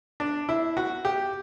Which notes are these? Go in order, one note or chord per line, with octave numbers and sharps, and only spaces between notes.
D4
E4
F#4
G4